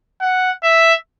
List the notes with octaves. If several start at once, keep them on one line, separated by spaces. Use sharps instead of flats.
F#5
E5